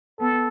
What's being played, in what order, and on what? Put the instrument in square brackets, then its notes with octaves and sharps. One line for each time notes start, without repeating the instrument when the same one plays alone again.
[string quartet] B3 [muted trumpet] A4